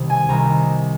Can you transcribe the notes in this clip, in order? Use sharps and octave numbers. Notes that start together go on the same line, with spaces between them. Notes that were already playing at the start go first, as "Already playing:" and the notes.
Already playing: C2 C3 D#3
G#5
C2 C3 D#3 A#5